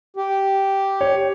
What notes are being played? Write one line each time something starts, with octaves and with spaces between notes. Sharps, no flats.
G4
C#5